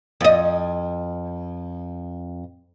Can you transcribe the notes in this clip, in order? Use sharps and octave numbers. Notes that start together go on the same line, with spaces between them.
F2 D#5